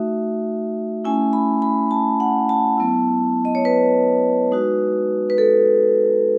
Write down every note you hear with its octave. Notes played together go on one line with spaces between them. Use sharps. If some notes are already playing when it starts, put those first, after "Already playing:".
Already playing: A3 D#4 F#4 E5
A3 C#4 E4 G#5
B5
B5
A5
F#5
A5
F#3 B3 E4
D#5
C#5
B4
G#3 D#4 F#4
B4
A4